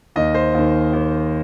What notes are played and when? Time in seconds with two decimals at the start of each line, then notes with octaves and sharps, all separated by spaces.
0.16 D#2 D#3 D#5
0.35 C5
0.54 D#2 D#3
0.93 D#2 D#3